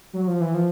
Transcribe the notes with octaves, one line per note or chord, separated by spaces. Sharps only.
F#3
F3
E3
F3